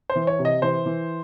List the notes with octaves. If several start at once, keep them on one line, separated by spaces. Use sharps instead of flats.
C5
E3
C#5
C3
D#5
E3 C5
E3